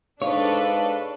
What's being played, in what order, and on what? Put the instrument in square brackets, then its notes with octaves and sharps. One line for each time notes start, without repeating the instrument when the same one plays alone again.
[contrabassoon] G#2 [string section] D4 A4 B4 [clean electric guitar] C#5 [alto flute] F5